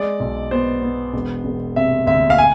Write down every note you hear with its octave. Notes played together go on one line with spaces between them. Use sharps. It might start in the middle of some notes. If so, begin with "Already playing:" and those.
Already playing: G#3 D5
B1
B3 C5
B3
E1
E1
C3 E5
D2 E5
F5
G#5